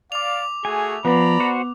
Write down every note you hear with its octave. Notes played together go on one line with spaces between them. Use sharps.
D5 F5 D6 F7
A3 F#4 G#4 G#5
F3 B3 D5 A#5 B5
F#4 C5 F#5